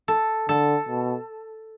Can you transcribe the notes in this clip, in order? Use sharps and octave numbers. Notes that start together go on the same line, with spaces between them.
A4
D3 A4
B2